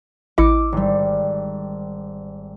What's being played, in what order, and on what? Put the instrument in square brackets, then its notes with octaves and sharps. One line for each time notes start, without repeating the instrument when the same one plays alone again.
[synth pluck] A1 E4 D#5 [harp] D6 E6 C#7
[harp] G#1 G3